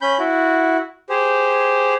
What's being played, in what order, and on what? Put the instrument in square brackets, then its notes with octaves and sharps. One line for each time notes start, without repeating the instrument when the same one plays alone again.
[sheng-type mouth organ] C#4 B5 G6
E4 F#4
G4 G#4 C5